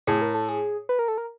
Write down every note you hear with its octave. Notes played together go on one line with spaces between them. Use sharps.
A2 G#4
A#4
A4
G#4
B4
A#4
A4
A#4